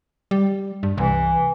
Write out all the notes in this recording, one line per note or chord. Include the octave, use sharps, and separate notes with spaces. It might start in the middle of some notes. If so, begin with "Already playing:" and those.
G3
G2
C2 E3